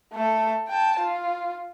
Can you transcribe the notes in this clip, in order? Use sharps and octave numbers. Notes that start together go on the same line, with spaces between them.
A3 A4
G5 A5
F4